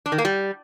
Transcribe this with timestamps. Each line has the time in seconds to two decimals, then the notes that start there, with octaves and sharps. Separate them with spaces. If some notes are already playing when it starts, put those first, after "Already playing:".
0.06 D4
0.12 D#3
0.18 A#3
0.25 G3